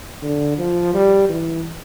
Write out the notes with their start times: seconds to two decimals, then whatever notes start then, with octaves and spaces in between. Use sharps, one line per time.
0.22 D3
0.58 F3
0.94 G3
1.29 E3